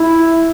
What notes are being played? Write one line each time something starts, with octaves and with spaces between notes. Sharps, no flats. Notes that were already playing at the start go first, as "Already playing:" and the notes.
Already playing: E4